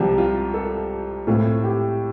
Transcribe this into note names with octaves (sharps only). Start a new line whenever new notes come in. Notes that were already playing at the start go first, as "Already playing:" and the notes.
Already playing: C2 C3 F3 G4
F4
A4
A2 A3 C4 F4
G4